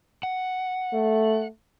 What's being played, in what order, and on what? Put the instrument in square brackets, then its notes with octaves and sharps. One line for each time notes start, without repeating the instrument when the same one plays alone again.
[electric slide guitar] F#5
[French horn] A3